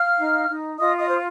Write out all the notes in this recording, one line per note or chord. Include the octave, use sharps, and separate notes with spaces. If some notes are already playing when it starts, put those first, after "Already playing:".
Already playing: F5 F6
D#4
D#4
F4 D#5 D#6
D#5 D#6
C5